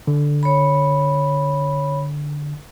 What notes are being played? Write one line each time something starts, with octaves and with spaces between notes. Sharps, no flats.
D3
C#5 B5